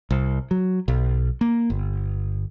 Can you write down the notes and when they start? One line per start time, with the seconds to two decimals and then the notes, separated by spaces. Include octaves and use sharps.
0.11 C2
0.51 F#3
0.88 B1
1.41 A#3
1.70 G1